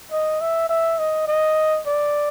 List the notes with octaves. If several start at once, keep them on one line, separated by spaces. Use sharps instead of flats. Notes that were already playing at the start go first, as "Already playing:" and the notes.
D#5
E5
E5
D#5
D#5
D5